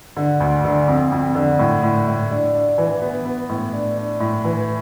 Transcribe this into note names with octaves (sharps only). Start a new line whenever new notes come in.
D3
D2
D3
F2
F2
D3
A2
A2
A2
D4
D4
E3
B3
B3
A2
D4
D4
A2
E3